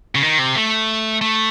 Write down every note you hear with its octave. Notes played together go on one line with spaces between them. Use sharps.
C#3
D#3
C3
A3
A3